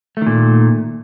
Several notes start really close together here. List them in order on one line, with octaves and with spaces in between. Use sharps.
A3 D#3 A#2